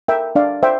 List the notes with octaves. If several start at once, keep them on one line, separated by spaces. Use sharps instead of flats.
A#4 E5 G5
D4 D5 F5
C5 E5 G5